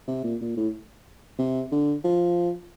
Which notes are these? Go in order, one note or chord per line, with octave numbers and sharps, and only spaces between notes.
C3
A#2
A#2
A2
C3
D3
F3